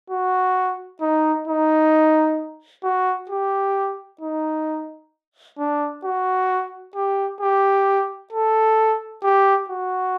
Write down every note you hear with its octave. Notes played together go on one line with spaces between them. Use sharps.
F#4
D#4
D#4
F#4
G4
D#4
D4
F#4
G4
G4
A4
G4
F#4